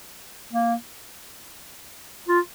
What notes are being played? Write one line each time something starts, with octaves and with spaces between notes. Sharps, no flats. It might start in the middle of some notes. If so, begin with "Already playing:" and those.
A#3
F4